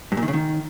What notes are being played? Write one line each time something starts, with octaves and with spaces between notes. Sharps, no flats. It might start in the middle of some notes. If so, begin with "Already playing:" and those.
G2
A#2
D#3
C#3
D#3